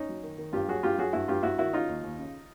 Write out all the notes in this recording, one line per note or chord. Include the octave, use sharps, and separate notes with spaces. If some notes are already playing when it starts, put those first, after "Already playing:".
Already playing: C#4 D#4
F#3
D#3
D#3
G2 F4 G4
F#3 F#4 G#4
G2 F4 G4
F#3 F#4 G#4
G2 E4 F#4
G2 F4 G4
G2 E4 F#4
D#3 E4 F#4
C#3 D#4 F4
D#2
D#2
C#3